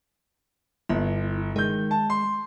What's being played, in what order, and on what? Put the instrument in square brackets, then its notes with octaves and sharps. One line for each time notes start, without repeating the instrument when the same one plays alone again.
[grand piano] G1 [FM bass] E4
[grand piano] D#3 G6 [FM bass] G#3
[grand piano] A5
C6